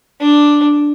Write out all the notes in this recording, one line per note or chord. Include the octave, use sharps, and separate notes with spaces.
D4